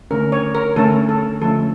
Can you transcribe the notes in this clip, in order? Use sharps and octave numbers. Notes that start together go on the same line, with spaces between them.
D3 A3 C#4 A#4
C#5
A#4
D3 A3 C#4 A4
A4
D3 F3 A3 C#4 A4